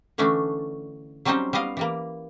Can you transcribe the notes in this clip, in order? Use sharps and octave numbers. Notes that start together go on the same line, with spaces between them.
D3 E3 A3 C#4 D4
F#3 G3 C4 C#4 D#4 C5
G3 B3 D#5 F5
E3 G3 A#3